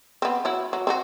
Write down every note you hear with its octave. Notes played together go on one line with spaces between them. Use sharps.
B3 C4
F#3 E4
F#3
C4 D#4 F#4